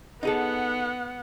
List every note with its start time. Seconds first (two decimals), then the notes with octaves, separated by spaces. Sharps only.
0.23 B3 D#4 G#4 A4 F#5